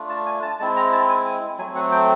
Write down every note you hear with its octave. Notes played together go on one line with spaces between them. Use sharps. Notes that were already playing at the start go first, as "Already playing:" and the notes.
Already playing: A3 D4 F4
A5
G#5
A5
G#3 C4 E4 A5
A#5
A5
G#5
G#5
F#3 A3 C4 G#5
F#5
G5